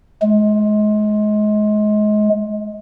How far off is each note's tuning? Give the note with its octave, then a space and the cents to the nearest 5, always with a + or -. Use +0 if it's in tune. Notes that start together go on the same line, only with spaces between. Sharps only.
G#3 +30